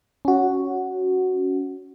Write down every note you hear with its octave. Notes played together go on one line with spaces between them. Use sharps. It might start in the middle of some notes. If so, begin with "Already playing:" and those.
C#4 F#4